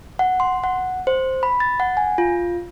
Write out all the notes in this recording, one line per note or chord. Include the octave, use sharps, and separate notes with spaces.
F#5
C6
F#5
C5
B5
A6
F#5
G#5
F4